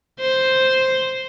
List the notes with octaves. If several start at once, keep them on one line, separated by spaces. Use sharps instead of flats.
C5